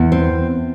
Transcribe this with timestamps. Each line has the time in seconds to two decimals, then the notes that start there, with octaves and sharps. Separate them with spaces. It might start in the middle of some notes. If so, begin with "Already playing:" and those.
Already playing: E2
0.12 C4